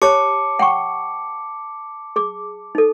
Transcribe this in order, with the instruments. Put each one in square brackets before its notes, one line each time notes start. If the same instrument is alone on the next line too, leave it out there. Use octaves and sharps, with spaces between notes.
[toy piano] G4 C#5 [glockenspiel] A5 D6 C#7
[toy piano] F#5 G5 C#6
G#4 D6
D#4 A4